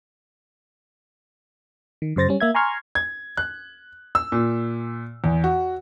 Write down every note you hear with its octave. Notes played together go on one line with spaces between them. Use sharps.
D#3
F#2 C#3 C5 A6 A#6
G3 C#4
A#3 E5 G#6
G#5 A#5 C6 C#6 F6 G#6
G#6
F#6
E6
A#2
E2
F#4